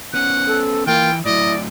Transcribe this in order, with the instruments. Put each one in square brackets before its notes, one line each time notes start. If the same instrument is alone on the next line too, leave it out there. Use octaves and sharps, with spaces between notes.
[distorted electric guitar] B3 C#4 [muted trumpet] F#5
[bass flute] A4
[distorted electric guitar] E3 [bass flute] A#3 [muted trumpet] F4 [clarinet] G5
[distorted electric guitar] A2 F#3 [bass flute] E4 [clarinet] D5 [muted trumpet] D#5